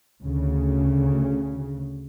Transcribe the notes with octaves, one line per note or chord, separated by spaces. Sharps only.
D2 C#3